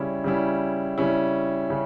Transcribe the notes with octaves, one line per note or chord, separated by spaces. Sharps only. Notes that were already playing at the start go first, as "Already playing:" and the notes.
Already playing: C#3 G3 C#4 E4
C#3 G3 C#4 E4
C#3 G3 C#4 E4
C#3